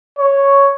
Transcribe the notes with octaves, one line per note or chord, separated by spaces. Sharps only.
C#5